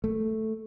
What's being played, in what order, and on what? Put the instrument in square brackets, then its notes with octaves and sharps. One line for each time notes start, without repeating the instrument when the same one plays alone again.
[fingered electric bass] A3